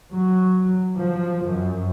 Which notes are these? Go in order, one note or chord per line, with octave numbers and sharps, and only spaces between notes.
F#3
F3
F#2